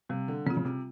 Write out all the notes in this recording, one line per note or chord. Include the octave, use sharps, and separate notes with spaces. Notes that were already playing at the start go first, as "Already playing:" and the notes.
C3 G3
D3
C#3 C4 F4
C#3
C3